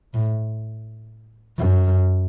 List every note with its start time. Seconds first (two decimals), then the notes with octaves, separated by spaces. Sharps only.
0.14 A2
1.58 F#2